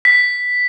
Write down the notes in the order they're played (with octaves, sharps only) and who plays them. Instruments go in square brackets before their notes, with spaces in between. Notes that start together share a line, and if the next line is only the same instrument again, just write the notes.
[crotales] B6